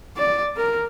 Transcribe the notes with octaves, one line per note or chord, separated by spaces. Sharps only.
D5
A#4